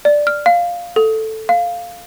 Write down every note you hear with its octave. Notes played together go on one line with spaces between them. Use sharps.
D5
F6
F5
A4
F5